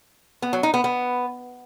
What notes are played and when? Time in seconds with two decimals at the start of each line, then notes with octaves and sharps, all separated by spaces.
0.42 B3
0.53 F#3
0.63 D#4
0.74 B3
0.84 B3